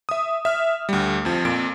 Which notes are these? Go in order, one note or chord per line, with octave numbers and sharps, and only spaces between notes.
E5 D#6
E5 F6
D2 G3
F2 F3
F2 A#2 D7